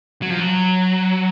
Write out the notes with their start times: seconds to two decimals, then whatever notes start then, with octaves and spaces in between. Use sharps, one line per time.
0.22 F#3
0.30 F3
0.38 F#3